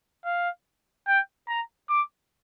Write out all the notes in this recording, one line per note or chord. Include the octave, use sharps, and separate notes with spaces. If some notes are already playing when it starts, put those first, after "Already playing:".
F5
G5
A#5
D6